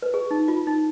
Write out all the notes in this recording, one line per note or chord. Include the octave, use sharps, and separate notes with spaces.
B4
G#4
D#4
F4
D#4